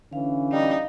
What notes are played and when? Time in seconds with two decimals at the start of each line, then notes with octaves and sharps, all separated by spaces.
0.13 D3 E3 C#4 F5
0.52 G3 D#4